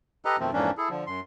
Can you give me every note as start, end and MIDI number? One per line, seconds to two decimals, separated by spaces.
0.25 0.36 67
0.25 0.36 69
0.25 0.36 71
0.25 0.36 75
0.25 0.36 82
0.39 0.51 41
0.39 0.51 47
0.39 0.51 51
0.39 0.51 53
0.39 0.51 57
0.39 0.51 60
0.53 0.71 41
0.53 0.71 44
0.53 0.71 52
0.53 0.71 58
0.53 0.71 61
0.53 0.71 62
0.78 0.89 64
0.78 0.89 68
0.78 0.89 69
0.89 1.04 50
0.89 1.04 53
1.07 1.20 42
1.07 1.20 84